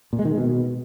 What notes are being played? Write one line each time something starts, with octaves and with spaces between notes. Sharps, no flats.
A#2
G#3
D#3
G#3
B2